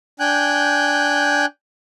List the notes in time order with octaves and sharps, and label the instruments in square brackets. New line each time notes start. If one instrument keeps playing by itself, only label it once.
[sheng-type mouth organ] D4 G5 G#5 F#6 G6